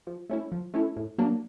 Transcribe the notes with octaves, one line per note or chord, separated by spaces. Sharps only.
F3
A3 C#4 E4
F3
A3 C#4 E4
A2
F#3 A#3 D4